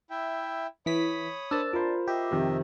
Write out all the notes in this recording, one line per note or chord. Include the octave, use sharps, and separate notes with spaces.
E4 E5 G5
E3 C#5 B5 D#6 B6
D4 A#4 C5 A5 E6
F4 A#4 C5 B5
G4 D#5 E5
F2 C3 D#3